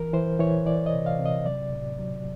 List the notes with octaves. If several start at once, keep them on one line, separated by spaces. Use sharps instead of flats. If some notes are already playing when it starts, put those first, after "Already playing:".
Already playing: E3 A#4
E3 C5
E3 C#5
E3 D5
D#5
C3
F5
C3
D#5
F#3 D5
A2
F#3